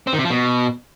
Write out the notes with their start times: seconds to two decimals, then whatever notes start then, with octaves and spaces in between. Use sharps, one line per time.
0.07 C4
0.13 D#3
0.19 C3
0.25 F3
0.30 B2